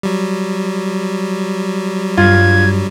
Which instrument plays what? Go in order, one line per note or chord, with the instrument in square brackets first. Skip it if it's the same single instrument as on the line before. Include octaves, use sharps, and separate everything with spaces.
[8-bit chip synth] F#3 G3
[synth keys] G2 [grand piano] F4 [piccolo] G#6